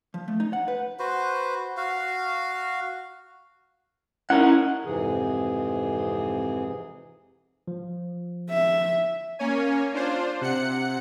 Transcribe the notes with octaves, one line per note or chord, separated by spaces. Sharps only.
F3
A3
D#4
F#5
B4
F#4 B4 C5
F#4 F5
C#4 D#4 E4 A#4 F#5
F2 G#2 C3 E3 G#4
F3
E5
A#3 C#4 C#5 G#5
D4 F4 C5
C3 F#5 F#6 C#7